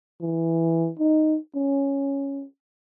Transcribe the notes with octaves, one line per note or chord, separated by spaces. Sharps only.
E3
D#4
C#4